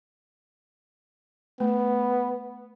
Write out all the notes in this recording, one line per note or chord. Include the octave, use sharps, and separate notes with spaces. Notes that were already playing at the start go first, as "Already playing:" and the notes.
A3 B3